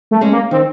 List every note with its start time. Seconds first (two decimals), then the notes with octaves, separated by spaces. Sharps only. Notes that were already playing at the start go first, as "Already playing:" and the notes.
0.11 A3
0.21 G#3 C#4
0.32 A#3
0.51 D#3 C4